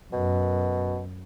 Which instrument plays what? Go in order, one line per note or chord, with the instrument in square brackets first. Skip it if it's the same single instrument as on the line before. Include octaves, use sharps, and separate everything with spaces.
[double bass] F#2 [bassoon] B2